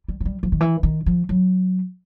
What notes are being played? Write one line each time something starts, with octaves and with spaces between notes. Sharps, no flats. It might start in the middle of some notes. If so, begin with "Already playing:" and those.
G3
F#3
G3
F3
D#3
E3
D#3
F3
F#3